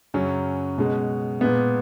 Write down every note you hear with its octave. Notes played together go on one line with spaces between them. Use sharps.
F#2 C#3 F#3 C#4
B2 G#3
A#2 G#3 B3